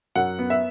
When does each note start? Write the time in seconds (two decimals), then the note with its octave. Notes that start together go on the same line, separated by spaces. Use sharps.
0.16 F#2 F#5
0.39 B3
0.50 E5